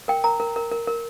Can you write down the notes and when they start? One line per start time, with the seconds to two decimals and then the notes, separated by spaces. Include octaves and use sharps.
0.08 A#4 G5
0.24 A#4 A#5
0.40 A#4
0.56 A#4
0.71 A#4
0.87 A#4